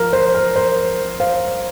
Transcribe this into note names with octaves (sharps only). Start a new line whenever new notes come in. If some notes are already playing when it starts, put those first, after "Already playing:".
Already playing: F3 A#4
C5
A#4
C5
C5 F5